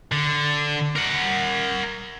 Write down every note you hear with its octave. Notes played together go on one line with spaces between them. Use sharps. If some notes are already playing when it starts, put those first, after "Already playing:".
D3
A#4 F#5